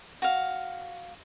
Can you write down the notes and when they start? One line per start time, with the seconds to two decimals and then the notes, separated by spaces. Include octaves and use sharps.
0.22 F#4 F5